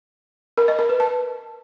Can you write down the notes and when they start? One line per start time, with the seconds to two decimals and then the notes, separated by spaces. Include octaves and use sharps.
0.57 A#4
0.68 D#5
0.79 A#4
0.89 B4
1.00 A5